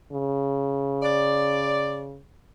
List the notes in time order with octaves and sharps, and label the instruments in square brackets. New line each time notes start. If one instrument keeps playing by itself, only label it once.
[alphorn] C#3
[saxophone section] D5